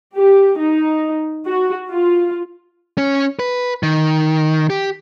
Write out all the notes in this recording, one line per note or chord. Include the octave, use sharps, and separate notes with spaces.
G4
D#4
F#4
F4
C#4
B4
D#3
G4